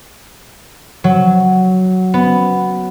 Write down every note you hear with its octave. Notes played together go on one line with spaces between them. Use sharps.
F#3
B3